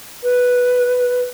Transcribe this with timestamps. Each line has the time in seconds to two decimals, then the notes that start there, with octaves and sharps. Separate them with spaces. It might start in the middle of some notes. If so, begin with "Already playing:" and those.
0.23 B4